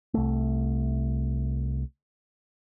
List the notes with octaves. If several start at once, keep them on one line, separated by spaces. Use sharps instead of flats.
C2 A3